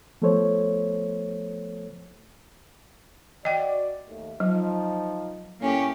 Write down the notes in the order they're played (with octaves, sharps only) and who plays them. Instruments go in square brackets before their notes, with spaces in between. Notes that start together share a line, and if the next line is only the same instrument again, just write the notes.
[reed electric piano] F3 A3 B3 A4 C5 C#5
[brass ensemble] F#4 D5 [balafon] D#5 G5
[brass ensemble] D#2 A3
[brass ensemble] F3 D#4 [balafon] F#3
[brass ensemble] A2 [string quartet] A#3 C#4 G4